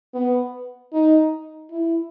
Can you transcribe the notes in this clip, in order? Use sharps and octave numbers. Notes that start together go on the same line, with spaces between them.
B3
D#4
E4